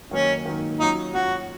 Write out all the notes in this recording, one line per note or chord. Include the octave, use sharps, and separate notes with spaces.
D#3 F#3 A#3 C#4 D#4
D#3 F#3 A#3 D#4
F#3 C#4 D#4 F4
F#3 C#4 F4 F#4